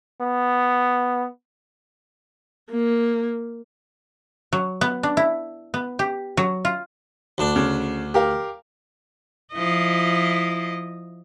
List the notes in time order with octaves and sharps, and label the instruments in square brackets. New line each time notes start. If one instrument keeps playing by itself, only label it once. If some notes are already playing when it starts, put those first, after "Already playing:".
[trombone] B3
[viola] A#3
[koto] F#3
B3
D4
E4
B3
G4
F#3
F4
[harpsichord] D2 D4
[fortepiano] C#3
G4 A#4 F5
[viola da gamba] F3 E4 D#5